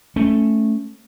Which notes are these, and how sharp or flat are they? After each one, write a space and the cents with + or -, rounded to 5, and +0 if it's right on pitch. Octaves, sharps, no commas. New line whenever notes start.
A3 +0 C#4 +0